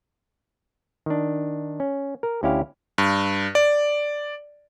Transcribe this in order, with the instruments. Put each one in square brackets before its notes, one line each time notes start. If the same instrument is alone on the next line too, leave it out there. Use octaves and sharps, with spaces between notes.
[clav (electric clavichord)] D#3 D4
C#4
A#4
D2 C#4 E4 G4 F5
[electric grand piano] G2
D5